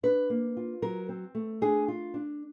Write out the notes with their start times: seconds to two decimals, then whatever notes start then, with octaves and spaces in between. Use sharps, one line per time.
0.03 D4 B4
0.30 A#3
0.57 F4
0.82 F#3 A#4
1.09 C4
1.35 A3
1.61 D4 G#4
1.88 F4
2.14 D4